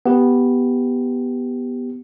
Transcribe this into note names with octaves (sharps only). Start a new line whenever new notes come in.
B3 G4